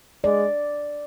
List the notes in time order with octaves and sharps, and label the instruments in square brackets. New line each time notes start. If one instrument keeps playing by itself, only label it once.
[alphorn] G#3 [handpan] D5